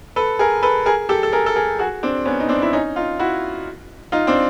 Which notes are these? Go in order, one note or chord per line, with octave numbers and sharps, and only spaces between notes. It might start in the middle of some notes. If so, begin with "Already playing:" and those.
A4 B4
G#4 A#4
A4 B4
G#4 A#4
G4 A4
A4
G#4 A#4
A4
G#4 A#4
F#4 G#4
C4 D4
B3 C#4
D#4
C4 D4
E4
C#4 D#4
D#4 F4
E4 F#4
D#4 F4
C4 D4